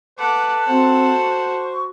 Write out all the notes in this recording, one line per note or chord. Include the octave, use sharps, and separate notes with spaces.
A4 B4 F#5 D6
C4 F#4 C5 F#5
C#6